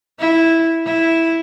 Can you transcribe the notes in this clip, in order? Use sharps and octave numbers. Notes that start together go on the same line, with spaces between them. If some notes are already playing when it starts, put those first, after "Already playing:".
E4
E4